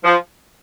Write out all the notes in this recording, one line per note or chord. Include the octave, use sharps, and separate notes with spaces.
F3